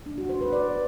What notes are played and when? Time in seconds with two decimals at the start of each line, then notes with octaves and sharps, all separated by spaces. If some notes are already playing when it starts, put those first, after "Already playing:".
0.06 D4
0.18 F#4
0.29 C5
0.41 B4
0.53 D5